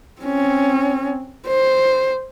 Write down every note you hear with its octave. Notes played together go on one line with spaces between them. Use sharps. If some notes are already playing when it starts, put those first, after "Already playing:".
C4 C#4
C5